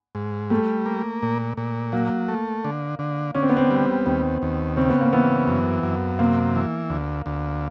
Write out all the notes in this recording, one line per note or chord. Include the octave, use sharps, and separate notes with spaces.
G#2
G3 A3
A#3
A#2
A#2
F#3 A#3
A3
D3
D3
D3 C#4
C4
B3
C4
G3
D#2 C4
D#2
C#3 C4
B3
A#3
E3 B3
F#2
F#2
C3 A#3
E3
D2
D2